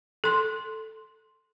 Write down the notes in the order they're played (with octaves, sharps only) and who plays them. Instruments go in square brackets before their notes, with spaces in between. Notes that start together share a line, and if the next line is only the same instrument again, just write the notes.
[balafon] A4 C6